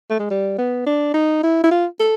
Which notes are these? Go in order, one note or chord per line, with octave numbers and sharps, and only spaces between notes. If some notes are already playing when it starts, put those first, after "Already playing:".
A3
G#3
G3
B3
D4
D#4
E4
E4
F4
A4